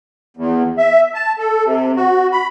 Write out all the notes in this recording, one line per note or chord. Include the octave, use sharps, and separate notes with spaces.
E2
E5
A5
A4
C3
F#4
B5